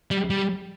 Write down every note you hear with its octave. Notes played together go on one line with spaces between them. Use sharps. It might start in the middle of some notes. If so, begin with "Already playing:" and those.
G3
G3